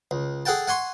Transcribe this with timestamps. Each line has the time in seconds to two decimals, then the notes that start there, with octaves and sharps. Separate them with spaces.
0.11 C#2
0.45 G#4 A4 F#5 G5 A5
0.68 F#5 G#5 C6 C#6